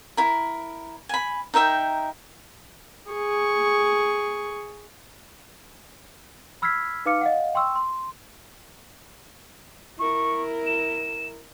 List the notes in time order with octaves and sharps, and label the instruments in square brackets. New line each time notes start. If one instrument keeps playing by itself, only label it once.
[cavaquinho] E4 A#4
G#5 B5
D#4 A#4 E5 G5
[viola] G#4 C#6
[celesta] B5 E6 F6 G#6 B6 C7
D#4 B4 F5 D6 F6 C#7
D#5 F5 F#5
G5 C6 C#6 E6
C6
[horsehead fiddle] E4 A#4 [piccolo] C#6
[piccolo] E7